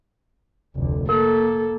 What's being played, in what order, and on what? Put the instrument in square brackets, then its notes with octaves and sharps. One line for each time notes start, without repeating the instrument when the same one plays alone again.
[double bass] F1 D2
[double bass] A#3 [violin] A4 [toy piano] A#4